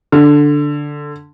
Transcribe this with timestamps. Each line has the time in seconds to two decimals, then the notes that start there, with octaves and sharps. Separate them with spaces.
0.12 D3